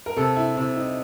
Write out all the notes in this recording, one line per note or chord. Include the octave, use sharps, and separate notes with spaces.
A#4
C3 A4
E4
C3 E4
D#4